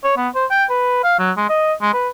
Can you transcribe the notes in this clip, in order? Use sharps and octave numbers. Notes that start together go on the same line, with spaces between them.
C#5
B3
C5
G5
B4
F5
F#3
G#3
D#5
G#3
B4